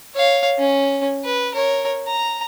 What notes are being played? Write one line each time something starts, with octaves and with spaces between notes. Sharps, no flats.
C#5 F5
C#4
B4
A#4 C#5
A#5